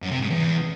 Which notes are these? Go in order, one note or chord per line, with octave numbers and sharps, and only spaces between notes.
F#2
C3
G#2
E2